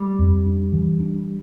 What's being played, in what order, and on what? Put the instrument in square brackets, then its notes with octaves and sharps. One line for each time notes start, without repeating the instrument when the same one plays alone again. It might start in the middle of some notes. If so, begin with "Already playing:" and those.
Already playing: [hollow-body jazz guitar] G3 [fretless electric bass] A3
[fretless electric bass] F2
D4
E3
D4